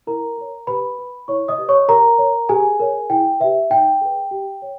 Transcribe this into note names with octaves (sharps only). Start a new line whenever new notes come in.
E4 A#4 A#5
A#4 C#5
G4 B4 B5
B4
E4 C#5 C#6
D#5 D#6
G4 B4
C#5 C#6
G4 A#4 A#5
C#5
G4 G#4 G#5
A#4 C#5
E4 G5
G4 B4 E5
D#4 G5
G#4 B4
G4
C#5